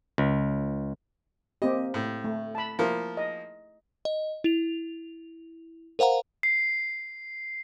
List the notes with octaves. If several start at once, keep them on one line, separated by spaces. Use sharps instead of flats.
C#2
A#3 C4 G4 D#5
A2
A3
A5 B5
F3 A#3 E4
D#5
D#5
E4 F7
A#4 C5 F5 F#5 A#5
C7